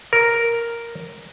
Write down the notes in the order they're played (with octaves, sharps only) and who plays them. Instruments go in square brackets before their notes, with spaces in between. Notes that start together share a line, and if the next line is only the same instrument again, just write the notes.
[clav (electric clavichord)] A#4